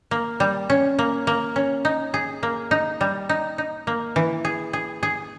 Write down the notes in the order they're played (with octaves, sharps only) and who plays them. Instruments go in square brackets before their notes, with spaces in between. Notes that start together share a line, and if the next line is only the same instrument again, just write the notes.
[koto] A#3
G3
C#4
A#3
A#3
C#4
D#4
G#4
A#3
D#4
G3
D#4
D#4
A#3
E3
G#4
G#4
G#4